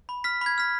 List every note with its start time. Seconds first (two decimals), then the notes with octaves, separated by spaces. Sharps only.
0.09 B5
0.24 F6 B6
0.41 B5 G#6
0.58 F6 B6